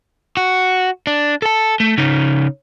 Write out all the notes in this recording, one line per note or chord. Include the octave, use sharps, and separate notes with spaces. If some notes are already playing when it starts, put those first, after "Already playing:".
F#4
D4
A4 A5
A3
C#3 D#4